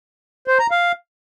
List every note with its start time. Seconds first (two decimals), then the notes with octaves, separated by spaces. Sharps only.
0.48 C5
0.59 A#5
0.71 F5